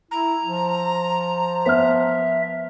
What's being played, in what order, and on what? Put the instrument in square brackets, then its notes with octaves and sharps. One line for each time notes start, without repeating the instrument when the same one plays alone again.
[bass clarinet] E4 [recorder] A#5
[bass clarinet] F3
[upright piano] B3 F6 [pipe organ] E5